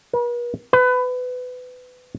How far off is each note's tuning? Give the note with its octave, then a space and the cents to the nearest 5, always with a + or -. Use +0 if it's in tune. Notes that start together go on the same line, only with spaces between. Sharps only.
B4 -45
B4 +25